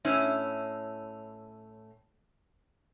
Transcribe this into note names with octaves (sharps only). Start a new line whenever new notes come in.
A2 C#4 E4